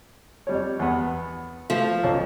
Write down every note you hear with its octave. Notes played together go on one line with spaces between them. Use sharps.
F2 G3 C#5
E2 B3
F3 A3
B1 C#4 A4